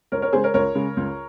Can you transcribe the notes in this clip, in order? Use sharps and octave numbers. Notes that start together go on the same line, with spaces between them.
C#2 A#4 C#5
A#4 C#5
C#3 G#3 G#4 C5
A#4 C#5
C#2 A#4 C#5
C#3 G#3
C#2